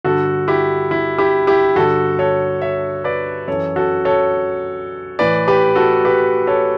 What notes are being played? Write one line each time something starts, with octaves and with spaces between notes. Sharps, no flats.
G2 D3 F#4 A4
E4 G4
E4
E4 G4
E4 G4
G2 D3 F#4 A4
A4 C#5
C#5 E5
B4 D5
F#2 E3 A4 C#5
F#4 A4
A4 C#5
A2 E3 B4 D5
G4 B4
F#4 A4
G4 B4
A4 C#5